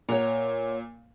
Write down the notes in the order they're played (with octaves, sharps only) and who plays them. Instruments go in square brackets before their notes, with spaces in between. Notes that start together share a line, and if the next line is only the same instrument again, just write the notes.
[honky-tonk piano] A#2 [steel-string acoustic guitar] C#5 F#5 A#5